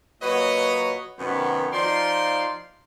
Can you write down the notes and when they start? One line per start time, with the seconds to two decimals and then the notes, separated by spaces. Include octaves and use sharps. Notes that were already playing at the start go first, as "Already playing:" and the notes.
0.21 A#2 F#3 F#4 B4 C#5 D#5
1.18 F#2 C3 D#3 B3
1.72 F3 D#4 F4 D5 C6